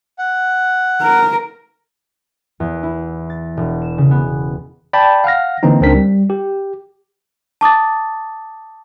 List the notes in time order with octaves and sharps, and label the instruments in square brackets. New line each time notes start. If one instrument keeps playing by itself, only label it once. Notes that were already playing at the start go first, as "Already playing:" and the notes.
[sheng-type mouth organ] F#5
[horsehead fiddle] A#4
[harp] E2
E4
A6
E1
E7
C#3
B3
[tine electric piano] D5 G5 A5 B5
F5 F#5 F6 A#6
D3 E3 A#3 C4 D#4
C#2 C#3 C4 D4 A#4 B6
G3
G4
[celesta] A5 D6 D#6 A6